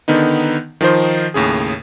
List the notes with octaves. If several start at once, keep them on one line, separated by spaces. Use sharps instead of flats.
D3 D#3 B3 D#4
D#3 F3 D#4 C5
D#2 A2 C#3 G#4